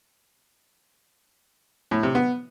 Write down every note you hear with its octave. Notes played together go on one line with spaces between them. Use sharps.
A2
C3
B3